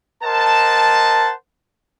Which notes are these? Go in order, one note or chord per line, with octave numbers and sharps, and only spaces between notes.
A#4 C5 D#5 F#5 A5